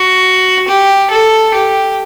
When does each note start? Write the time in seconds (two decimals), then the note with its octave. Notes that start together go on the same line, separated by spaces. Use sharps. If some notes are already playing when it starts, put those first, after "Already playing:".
Already playing: F#4
0.68 G4
1.11 A4
1.54 G4